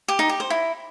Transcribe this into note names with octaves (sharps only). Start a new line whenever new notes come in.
G4
D#4
G4
C5
E4